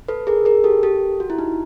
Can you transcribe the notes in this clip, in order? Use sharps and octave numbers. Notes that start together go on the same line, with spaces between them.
A4 B4
G#4 A#4
G#4 A#4
G4 A4
G4 A4
F#4
E4
D#4